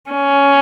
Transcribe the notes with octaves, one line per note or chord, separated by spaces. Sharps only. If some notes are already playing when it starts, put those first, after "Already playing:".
C#4